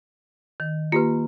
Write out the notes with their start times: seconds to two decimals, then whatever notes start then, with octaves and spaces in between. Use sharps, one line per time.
0.60 D#3
0.92 A#3 F4 G4 B4